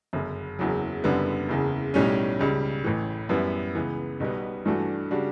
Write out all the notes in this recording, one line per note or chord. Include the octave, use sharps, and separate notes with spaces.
G1 F#2 C#3
F#1 E2 C#3 F#3
F#1 F#2 D3 G3 B3
F#1 E2 C#3
B1 A2 G3 C#4
C#2 C#3 G3
A1 A2 E3
F#2 E3 G3 B3 E4
C#2 C#3 E3 B3
B1 B2 G3 B3
G2 E3 A3 D4 F#4
C#3 G3 D4 F#4